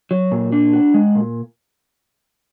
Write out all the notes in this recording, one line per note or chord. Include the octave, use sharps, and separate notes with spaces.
F#3
A#2
D4
F#4
G#3
A#2